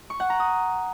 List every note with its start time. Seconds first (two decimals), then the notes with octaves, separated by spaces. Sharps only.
0.10 C#6
0.20 F#5
0.30 A#5
0.40 D#6